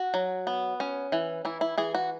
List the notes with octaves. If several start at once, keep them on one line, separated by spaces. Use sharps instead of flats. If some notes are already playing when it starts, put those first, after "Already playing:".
Already playing: F#4
F#3
B3
C#4
E3
E3 E4
E4
E3 G#4
F#4